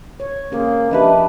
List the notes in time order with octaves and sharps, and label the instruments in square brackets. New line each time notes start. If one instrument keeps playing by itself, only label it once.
[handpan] C#5
[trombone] A#3 [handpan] C#4 G#4 C5
[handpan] F3 D4 G4 [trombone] B4 [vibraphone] D#5 E5 A5